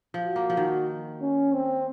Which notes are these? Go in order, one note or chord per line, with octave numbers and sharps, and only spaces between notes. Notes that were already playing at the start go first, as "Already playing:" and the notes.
F3
F#4
A#3
F3
D#3 F#4
C#4
C4